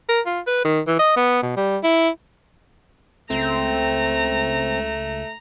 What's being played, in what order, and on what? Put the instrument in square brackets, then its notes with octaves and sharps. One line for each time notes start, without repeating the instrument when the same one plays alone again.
[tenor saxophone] A#4
F4
B4
D#3
E3
D#5
B3
B2
G3
E4
[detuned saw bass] C#2 [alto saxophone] A3 [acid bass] C4 [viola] A#5